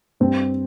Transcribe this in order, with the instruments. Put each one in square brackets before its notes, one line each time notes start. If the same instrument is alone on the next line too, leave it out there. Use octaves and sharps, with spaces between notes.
[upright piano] G2 C4